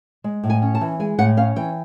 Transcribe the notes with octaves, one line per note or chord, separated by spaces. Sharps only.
G#3
A2
G#5
C#4
A5
E3
G#3 G#5
A2 F#5
C#4 F5
E3 G5